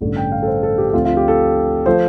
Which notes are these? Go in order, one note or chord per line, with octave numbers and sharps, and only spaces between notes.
A1 G2 D3 A3
G5
F5
A4
C5
A4
G4
G4
D2 D3 F3 A3 C4 F4
F4
G4
A4
F3 A3 C5